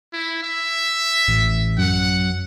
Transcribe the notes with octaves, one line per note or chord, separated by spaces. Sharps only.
E4
E5
A1
F#2 F#5